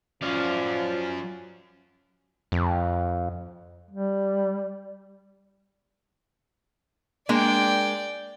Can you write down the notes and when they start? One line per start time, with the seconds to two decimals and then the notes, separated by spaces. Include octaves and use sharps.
0.22 F#2 F3 C#4 F4 D5 F5
2.52 F2
3.91 G3
7.29 G#3 A#3 D4 D5 G5